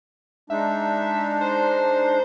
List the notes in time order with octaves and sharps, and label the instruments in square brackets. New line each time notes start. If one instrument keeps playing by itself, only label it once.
[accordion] G#3 D4 D#4 [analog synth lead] E5
[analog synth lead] C5